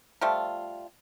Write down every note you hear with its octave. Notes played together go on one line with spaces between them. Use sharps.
F3 G3 A3 F4